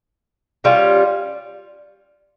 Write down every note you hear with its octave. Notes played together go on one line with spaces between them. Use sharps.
G3 C#4 F4